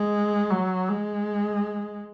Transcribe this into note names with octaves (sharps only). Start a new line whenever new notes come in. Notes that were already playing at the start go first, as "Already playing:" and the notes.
Already playing: G#3
F#3
G#3